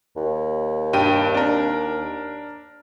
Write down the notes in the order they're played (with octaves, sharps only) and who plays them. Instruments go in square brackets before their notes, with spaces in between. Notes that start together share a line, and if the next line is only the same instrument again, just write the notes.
[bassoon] D#2
[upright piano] G2 G5 D#7
D4 A#4